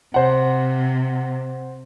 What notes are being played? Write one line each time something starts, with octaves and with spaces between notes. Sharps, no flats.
C3 C5 F#5